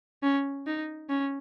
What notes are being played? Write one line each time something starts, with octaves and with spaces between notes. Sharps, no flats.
C#4
D#4
C#4